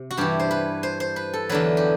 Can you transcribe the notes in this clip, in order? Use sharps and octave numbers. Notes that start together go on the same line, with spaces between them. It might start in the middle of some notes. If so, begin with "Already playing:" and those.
Already playing: C3
F#4
G2 E3 G4
C5
B4
C5
C5
B4
A4
E2 D3 F#3 B4
G4